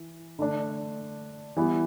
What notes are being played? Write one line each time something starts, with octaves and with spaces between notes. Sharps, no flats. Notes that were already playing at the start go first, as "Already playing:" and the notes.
Already playing: E3
D3 A3 D4
E3 G3 B3 E4